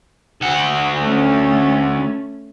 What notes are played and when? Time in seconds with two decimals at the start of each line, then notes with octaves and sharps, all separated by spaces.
0.41 D2 F#5
1.01 A3 C#4